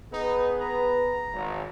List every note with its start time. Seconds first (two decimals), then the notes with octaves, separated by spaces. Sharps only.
0.13 B3 D#4 G#4 B4
0.61 A#5
1.33 G#1